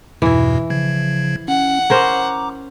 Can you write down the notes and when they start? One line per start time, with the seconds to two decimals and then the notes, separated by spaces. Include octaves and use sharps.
0.22 E2 G2 B2 E3 E4
0.70 C#3 F3 G#6
1.48 C#4 F#5
1.90 C#4 A#4 C5 A#5 D6